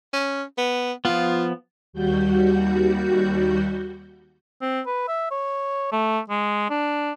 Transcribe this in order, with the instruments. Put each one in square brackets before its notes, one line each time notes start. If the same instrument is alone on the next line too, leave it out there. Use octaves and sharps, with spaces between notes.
[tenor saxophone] C#4
B3
[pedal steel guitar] F3 B3 [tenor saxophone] F4
[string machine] D#2 G3 F#4 G6
[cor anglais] C4
B4
E5
C#5
A3
G#3
D4